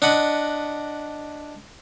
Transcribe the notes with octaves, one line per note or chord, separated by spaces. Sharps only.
D4 D#5 F#5 B5